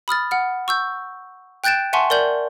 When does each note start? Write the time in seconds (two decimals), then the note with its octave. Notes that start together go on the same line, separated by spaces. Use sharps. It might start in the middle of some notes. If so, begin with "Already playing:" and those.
0.08 B5 D#6 F6 A6
0.31 F#5 F6
0.68 C#6 E6 G6
1.64 G5 F#6 G6 A6 D7 E7
1.93 E5 F#5 G#5 A5 C6 C#6
2.10 A#4 D5 G6 F#7